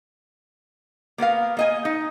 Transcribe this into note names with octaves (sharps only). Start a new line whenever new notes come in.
A#3 B3 A#4 F5
A#3 D#5 G#5
D#4